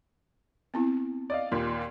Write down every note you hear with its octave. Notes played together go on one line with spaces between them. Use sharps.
B3 C4 E4
D5 D#5 F5
D#2 A#2